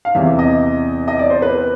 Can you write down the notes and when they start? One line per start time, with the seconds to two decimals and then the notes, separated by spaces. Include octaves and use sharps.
0.05 F5
0.15 E2 C3 E3 E5
0.39 D#5
1.08 D#5
1.19 D5
1.30 C5
1.42 B4